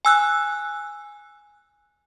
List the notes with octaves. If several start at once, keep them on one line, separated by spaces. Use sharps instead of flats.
G#5 E6 F#6